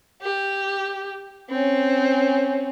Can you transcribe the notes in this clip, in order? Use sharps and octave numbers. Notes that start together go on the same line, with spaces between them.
G4
C4 C#4